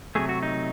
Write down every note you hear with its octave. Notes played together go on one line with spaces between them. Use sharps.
C3 F#3 A3 G#4
F#4
D#4